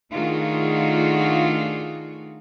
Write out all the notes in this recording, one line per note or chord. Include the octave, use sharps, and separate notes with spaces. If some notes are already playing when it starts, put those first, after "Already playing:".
D#3 A3 D4 F4 F#4 G#4